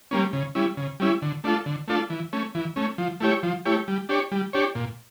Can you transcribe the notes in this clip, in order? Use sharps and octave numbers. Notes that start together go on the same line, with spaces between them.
G3 A#3 C#4
C#3
G3 C#4 E4
C#3
G3 C#4 E4
D3
A3 D4 F4 A4
D3
A3 D4 F4 A4
E3
A3 C#4
E3
A3 C#4
F3
A3 E4 G4 C#5
F3
A3 E4 G4 C#5
G3
D4 G4 C#5
G3
D4 G4 C#5
A#2